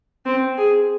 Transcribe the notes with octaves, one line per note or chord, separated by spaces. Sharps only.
C4
G#4